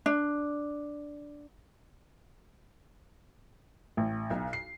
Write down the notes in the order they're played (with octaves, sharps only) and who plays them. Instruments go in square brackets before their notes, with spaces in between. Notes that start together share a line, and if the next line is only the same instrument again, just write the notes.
[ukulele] D4
[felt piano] A1
B1
C7